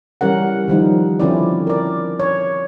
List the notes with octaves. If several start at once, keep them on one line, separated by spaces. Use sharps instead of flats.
E3 G3 C#4 A#4 F#5
D#3 F3 G3 D#4
D3 F3 C4 C#4 E4 D5
A#4 D5
C#5